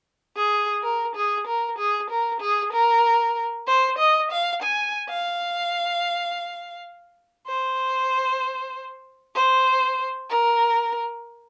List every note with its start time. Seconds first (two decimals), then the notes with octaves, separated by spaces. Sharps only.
0.37 G#4
0.83 A#4
1.16 G#4
1.47 A#4
1.78 G#4
2.10 A#4
2.41 G#4
2.73 A#4
3.67 C5
3.98 D#5
4.31 F5
4.62 G#5
5.09 F5
7.47 C5
9.35 C5
10.30 A#4